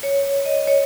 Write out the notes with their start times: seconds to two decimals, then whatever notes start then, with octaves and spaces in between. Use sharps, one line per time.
0.03 C#5
0.45 D#5
0.67 C#5